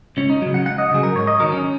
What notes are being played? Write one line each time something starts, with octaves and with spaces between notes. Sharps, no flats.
C#2 C#4
D#4
C#3 F#3
F#5
C#2 F#5
D#5
C#3 F#3 G#4
A#4
G#2 C#5
D#5
D#3 F#3 A#4
C#4